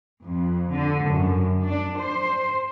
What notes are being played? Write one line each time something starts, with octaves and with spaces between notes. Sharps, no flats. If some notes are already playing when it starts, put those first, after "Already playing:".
F2
D3
F#2
D4
C5